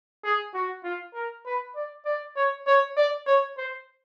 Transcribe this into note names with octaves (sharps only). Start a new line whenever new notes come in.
G#4
F#4
F4
A#4
B4
D5
D5
C#5
C#5
D5
C#5
C5